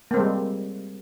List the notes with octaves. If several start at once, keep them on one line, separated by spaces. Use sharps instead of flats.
G3 G#3 A#3 C4